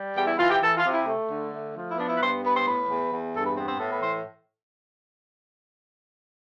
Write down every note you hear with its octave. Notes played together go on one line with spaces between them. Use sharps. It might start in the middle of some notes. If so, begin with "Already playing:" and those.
Already playing: G3
E2 G4
E4
E3 F4
G4
E3 A4
F4
C3
E4
A3
D3
A3
F3
E4
B3 D4
E4
B4
G2 C5
B3 B4
C5
A2 B4
E2
E2
G2 A4
B4
B3 C4
C4
A2 A4
B4
E3 C5